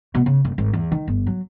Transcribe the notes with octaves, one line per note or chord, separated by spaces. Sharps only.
B2
C#3
F#1
G#1
E2
D#3
G1
F#3